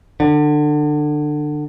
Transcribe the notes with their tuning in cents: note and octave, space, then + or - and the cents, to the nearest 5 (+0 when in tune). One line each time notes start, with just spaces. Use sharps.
D3 +25